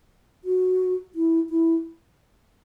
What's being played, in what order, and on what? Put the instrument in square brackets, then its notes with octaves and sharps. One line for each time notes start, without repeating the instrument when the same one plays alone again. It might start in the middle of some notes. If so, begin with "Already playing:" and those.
[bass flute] F#4
E4
E4